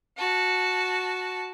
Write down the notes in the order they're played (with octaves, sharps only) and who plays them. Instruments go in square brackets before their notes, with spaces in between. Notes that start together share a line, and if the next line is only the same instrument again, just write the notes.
[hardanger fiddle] F#4 A5